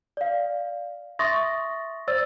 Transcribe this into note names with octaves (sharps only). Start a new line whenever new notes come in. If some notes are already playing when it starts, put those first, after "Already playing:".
D5 F5
E5 C6 C#6 D#6 A6 A#6
C5 D5 E6 A6